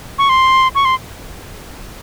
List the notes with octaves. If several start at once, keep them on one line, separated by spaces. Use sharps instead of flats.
C#6
C6
C#6
C6